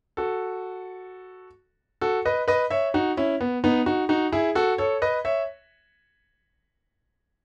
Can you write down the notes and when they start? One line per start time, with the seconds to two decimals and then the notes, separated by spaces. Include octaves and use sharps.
0.17 F#4 A4
2.01 F#4 A4
2.25 B4 D#5
2.48 B4 D#5
2.70 C#5 E5
2.94 D#4 F#4
3.17 C#4 E4
3.41 B3
3.64 B3 D#4
3.86 D#4 F#4
4.09 D#4 F#4
4.32 E4 G#4
4.55 F#4 A4
4.78 A4 C#5
5.02 B4 D#5
5.25 C#5 E5